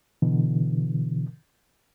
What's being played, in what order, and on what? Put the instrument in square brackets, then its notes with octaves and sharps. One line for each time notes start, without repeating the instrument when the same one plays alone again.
[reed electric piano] B2 D3 E3